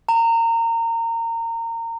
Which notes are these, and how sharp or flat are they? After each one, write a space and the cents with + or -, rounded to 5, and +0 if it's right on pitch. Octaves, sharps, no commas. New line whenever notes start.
A#5 -25